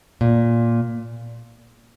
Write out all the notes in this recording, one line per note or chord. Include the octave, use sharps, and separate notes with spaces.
A#2